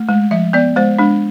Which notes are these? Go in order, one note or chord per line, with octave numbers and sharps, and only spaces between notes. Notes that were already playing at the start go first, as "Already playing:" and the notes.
Already playing: A3
G#3
F3 E5
B3 D5
G#3 C5
G#3 D4